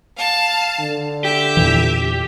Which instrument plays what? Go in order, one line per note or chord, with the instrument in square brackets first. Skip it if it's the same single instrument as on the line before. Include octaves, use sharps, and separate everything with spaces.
[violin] F5 A5
[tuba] D3
[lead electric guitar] G4 [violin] E5
[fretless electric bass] E2 A#2 E3